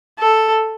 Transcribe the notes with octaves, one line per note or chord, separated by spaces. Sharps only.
A4